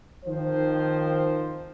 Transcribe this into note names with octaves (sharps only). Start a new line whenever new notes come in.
D#3 F3 C4 C5